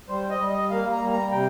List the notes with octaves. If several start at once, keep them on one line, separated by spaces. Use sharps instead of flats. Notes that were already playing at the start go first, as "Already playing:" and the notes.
G3 C5
D#5
G3
D#5
A#3 F5
A#5
G3
A#5
C3 G5